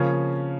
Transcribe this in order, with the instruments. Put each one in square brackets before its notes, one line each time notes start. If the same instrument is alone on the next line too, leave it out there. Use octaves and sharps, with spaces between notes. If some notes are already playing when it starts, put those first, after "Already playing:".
Already playing: [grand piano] C#3 F3 A#3 C#4